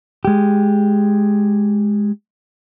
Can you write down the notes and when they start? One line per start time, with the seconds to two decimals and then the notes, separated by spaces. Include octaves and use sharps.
0.25 G#3 G4